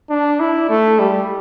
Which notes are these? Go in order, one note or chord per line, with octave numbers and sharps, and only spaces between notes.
D4
E4
A3
G3